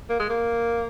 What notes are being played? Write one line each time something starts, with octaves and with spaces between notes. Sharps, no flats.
A#3
G#3
A#3